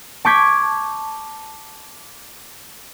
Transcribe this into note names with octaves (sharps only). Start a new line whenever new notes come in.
A5 C#6 D6 G6 G#6 B6